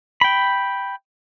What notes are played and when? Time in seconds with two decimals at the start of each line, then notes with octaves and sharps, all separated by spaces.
0.21 G5 B5